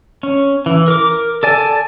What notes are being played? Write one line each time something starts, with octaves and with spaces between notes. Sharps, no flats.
C#4
E3
A#4 D6
A4 D5 G#5 A5